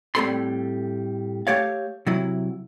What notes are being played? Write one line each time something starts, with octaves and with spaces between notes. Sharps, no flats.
A2 G3 C4 A4 B5 C6
A3 G4 C#5 F5
C3 F#3 E4